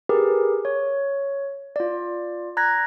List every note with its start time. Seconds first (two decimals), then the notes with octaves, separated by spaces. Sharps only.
0.09 G4 G#4 A#4 B4
0.65 C#5
1.76 F4 D5
2.57 A#5 F#6 G#6 A#6